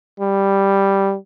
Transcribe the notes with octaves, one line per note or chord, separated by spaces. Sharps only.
G3